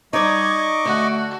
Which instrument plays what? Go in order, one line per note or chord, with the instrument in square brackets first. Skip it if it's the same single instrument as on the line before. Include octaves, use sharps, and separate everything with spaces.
[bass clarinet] G3 [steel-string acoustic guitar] D#4 D5 [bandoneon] D#5 C#6 D6 [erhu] G#6
[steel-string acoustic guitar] D3 [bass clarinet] A3 [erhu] F#4